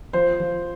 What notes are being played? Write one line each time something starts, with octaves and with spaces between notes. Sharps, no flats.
F3 C5
F3